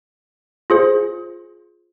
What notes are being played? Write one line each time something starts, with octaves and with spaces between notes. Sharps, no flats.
F4 G#4 C5